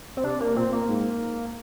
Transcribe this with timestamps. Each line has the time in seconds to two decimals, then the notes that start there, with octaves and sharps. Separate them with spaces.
0.17 C4
0.24 C3 D4
0.40 A#3
0.56 A#2 C4
0.72 A#3
0.88 G#2